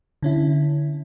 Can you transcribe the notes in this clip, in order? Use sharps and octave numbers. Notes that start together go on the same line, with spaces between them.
D3 C#4 E4